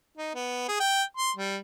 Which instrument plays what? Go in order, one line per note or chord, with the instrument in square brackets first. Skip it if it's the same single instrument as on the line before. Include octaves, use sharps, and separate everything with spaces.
[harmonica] D#4
B3
G#4
G5
C6
G3